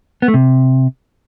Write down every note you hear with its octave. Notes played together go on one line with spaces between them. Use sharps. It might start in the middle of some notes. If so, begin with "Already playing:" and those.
B3
A3
C3